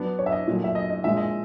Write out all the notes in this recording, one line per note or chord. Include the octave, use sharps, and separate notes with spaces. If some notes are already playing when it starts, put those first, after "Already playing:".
Already playing: F#3 B3 D4
C#5
E5
D#5
A#2 F#3 A3
E5
D#5
D#5
A#2 F3 G#3 E5
D#5